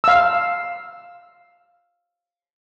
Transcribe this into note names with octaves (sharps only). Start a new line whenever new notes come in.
F5 E6